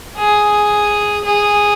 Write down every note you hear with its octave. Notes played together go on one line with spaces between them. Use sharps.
G#4
G#4